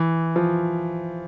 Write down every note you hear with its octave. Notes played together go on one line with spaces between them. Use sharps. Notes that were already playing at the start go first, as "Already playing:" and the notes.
Already playing: E3
F3